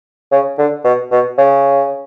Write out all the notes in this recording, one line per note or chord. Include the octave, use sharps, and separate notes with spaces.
C#3
D3
B2
B2
C#3